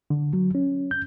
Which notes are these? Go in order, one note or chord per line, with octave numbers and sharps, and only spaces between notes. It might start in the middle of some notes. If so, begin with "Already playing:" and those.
D3
F#3
C#4
G6